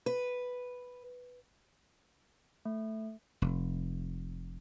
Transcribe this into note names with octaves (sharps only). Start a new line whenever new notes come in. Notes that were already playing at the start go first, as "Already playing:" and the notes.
B4
A3
F1